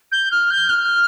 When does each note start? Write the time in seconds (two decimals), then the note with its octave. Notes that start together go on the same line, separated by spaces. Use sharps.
0.11 G6
0.31 F6
0.50 G6
0.69 F6